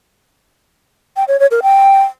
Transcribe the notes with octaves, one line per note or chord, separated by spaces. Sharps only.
G5
C#5
C#5
A#4
G5